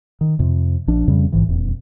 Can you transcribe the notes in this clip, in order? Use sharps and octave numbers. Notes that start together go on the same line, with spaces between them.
D#3
F2 C3
A#1 F3 D4
F2 C#3 G3
A#1 G#2 E3
D#1 E2